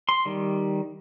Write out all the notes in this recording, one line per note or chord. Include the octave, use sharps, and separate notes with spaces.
C6
D#3 G3